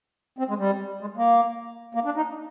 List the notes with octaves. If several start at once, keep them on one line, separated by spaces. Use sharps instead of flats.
C4
G#3
G3
G#3
A#3
A#3
D4
D#4